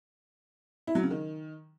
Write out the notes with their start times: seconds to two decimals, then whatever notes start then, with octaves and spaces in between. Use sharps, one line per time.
0.87 E4
0.95 F#3
1.03 C#3
1.11 D#3